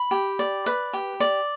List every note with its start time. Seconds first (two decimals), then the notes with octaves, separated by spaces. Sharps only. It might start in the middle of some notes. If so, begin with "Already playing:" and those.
Already playing: B5
0.11 G4
0.39 D5
0.66 B4
0.93 G4
1.20 D5